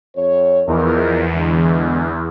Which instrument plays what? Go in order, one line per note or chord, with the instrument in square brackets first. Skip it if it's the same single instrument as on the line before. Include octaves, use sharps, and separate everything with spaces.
[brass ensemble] F2 C#5
[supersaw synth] E2 [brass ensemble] F3 D#4 A#4
[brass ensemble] D3 G#3